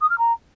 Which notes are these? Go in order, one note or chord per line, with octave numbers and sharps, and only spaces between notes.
D#6
F6
A#5